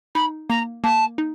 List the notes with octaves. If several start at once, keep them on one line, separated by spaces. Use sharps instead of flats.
D#4 B5
A#3 A#5
A#3 A5
D#4